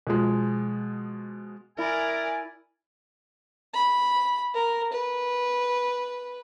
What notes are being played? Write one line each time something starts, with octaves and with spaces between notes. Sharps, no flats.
B2 F3 G#3
E4 A#4 D5 E5 G#5
B5
A#4
B4